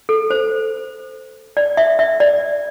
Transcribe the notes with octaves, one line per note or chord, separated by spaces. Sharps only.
A4
C5
D5
E5
E5
D5